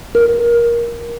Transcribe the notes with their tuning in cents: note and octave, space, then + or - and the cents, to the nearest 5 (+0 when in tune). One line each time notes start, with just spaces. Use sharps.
A#4 +15